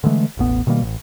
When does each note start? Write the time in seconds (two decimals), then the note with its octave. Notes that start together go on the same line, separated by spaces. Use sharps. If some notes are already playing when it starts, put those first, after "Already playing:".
0.04 D3 E3 G#3 A3
0.37 E1 A1 B3
0.67 B2 D#3 G3 A#3
0.82 A1